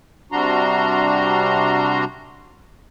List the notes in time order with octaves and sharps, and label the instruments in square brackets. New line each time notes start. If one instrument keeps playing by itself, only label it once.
[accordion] C3 G3 D4 F#4 A#5 C6